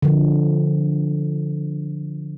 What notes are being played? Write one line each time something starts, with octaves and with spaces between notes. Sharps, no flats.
D3 F3